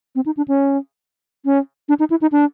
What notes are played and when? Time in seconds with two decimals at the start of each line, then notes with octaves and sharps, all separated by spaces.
0.15 C4
0.26 D#4
0.37 D4
0.48 C#4
1.45 C#4
1.89 D4
1.99 D#4
2.10 E4
2.22 D#4
2.32 D4